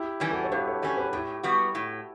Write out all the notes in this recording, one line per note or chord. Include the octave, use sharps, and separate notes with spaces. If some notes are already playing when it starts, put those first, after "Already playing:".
Already playing: E4 G4
E3 G3 C#4
F#4 A4
C#5
G2 G4 B4
A4 C#5
E3 G3 C#4 A4 C#5
G4 B4
A2 E4 G4
G3 B3 F#4
A2